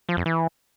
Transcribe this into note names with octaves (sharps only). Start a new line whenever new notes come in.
F3
F2
E3